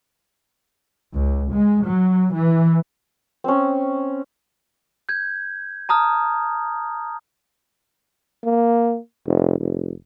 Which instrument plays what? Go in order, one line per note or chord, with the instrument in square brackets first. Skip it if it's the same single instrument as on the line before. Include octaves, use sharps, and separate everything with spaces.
[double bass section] C#2
G#3
F#3
E3
[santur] C4 C#4
[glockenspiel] G6 G#6
A5 A#5 D#6 F6
[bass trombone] A#3
F1
F1